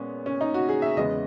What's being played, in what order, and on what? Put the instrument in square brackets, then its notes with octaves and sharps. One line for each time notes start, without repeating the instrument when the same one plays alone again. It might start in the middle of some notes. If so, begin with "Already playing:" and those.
Already playing: [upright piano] A#2 G#3 B3 C#4
C#4
D#4
F#4
G#4
E5
E2 C#3 G#3 B3 D#5